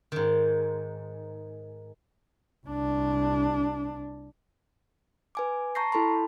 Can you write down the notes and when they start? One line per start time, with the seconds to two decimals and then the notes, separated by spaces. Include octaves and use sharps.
0.12 G#2 D#3
2.66 C2 D4
5.35 B4 G#5 D6
5.75 A5 A#5 C#6 G6 A#6 C7
5.92 E4 A4 A5 B5 C6